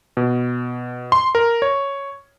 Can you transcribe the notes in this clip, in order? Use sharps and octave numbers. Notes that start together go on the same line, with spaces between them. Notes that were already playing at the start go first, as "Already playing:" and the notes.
B2
C6
A#4
C#5